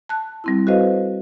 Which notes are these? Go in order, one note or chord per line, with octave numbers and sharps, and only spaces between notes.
A5 F#6
G3 C4 E4
F#4 A4 B4 C5 D#5 F5